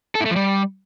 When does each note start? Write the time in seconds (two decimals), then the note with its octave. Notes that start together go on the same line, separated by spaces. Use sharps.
0.15 A4
0.20 E4
0.26 A3
0.31 F3
0.36 G3